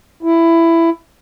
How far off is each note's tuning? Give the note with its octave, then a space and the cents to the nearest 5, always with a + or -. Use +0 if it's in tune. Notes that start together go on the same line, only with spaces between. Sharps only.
E4 +15